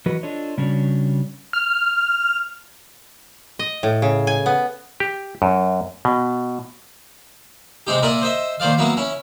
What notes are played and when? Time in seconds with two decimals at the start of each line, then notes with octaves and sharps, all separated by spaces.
0.06 E3 F#3 D#4 F#4 B4
0.23 D4 F4 A4 C#5 D#5
0.58 C#3 G3 C#4 D4 F#4 C#5
1.53 F6
3.59 D#5
3.83 A2
4.02 C#3
4.27 G#5
4.46 B3
5.00 G4
5.42 F#2
6.05 B2
7.87 C3 G#3 C4 D#4 G4
8.02 A#2 E4 A#4 D5 D#6
8.22 C5 D#5 E5
8.60 A#2 D#3 C5 D5 F5
8.78 F#3 A#3 B3 E4
8.97 C#4 E4